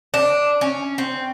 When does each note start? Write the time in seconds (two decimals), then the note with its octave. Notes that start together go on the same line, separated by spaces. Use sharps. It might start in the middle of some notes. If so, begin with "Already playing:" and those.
0.14 D4
0.61 C#4
0.98 C4